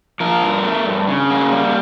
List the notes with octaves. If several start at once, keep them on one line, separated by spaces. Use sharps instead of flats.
F3 A#4
G2
A3
G2
C#3
A#3
G3